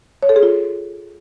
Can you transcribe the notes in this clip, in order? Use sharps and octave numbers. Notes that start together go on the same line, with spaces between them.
C#5
A4
G#4
F4